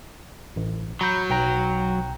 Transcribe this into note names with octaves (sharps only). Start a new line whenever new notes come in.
A1
F#3 A#5 B5 G6
B1 G5 A#5